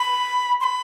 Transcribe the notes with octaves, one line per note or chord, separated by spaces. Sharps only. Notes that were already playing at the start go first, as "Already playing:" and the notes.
Already playing: B5
C6
B5